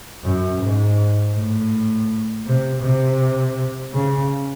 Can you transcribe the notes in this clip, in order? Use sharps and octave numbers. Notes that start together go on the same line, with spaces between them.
F#2
G#2
A2
C3
C3
C#3